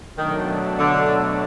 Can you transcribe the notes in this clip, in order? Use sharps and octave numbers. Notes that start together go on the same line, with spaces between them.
B2 D#3 F#3 A3 D4
D3